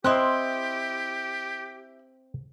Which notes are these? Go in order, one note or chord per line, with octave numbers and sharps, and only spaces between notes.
C4 E4 G4 D#5 C6 F#6